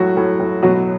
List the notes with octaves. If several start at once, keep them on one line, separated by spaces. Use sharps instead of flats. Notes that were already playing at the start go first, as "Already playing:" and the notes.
Already playing: A2 F#3 F#4
A2
A2
B2 F#3 F#4